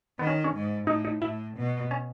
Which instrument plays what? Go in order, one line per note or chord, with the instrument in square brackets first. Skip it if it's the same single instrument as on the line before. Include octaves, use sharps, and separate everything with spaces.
[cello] D#3 [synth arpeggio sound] B3
[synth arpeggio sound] C#4
C#4
[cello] G#2
[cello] A2 [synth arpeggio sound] D#4
[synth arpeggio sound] D#4
[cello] A2 [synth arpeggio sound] E4
[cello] B2
[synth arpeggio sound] C#4